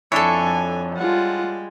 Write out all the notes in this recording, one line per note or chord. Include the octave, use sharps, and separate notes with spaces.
F2 D4 E4 A4 C#5 G#5
G3 G#3 F4 F#5